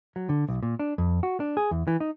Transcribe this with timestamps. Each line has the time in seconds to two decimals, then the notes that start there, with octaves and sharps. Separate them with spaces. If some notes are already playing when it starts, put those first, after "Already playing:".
0.16 F#3
0.29 D3
0.49 B1
0.63 A#2
0.79 D4
0.98 F2
1.23 F#4
1.40 D4
1.57 G#4
1.71 E2
1.87 E3
2.00 D#4